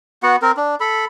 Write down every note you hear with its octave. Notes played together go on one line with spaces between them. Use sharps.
B3 F#4 F#5
C4 A#4
D4
A4 B5